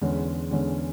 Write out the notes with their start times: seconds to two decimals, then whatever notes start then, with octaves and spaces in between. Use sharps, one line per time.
0.02 E2 D3 G#3 C#4
0.51 E2 D3 G#3 C#4